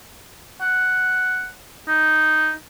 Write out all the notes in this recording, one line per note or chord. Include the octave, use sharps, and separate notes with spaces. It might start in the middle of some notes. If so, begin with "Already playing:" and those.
F#5
D#4